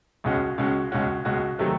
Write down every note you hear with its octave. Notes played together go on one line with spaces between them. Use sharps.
C#2 B2 G#3 C#4 F#4
C#2 B2 G#3 C#4 F#4
C#2 B2 G#3 C#4 F#4
C#2 B2 G#3 C#4 F#4
C3 D#3 F#3 A3